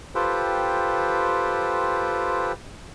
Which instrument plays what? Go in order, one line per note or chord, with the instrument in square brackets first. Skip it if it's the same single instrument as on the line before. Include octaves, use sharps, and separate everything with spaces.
[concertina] F4 G4 A4 B4 C5 G5